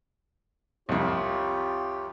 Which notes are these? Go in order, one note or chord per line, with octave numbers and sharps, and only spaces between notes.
C2 F2 F4 G4 C#5